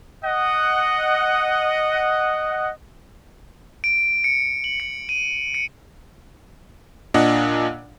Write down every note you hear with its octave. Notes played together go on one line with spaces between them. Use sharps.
D#5 F#5
D7
C#7
F#7
C#7
D#7
C#7
A#2 D4 D#5 F#5